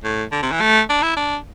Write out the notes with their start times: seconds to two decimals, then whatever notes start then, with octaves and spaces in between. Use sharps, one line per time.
0.04 A2
0.32 D3
0.42 C3
0.52 E3
0.61 A3
0.89 D4
1.02 E4
1.16 D4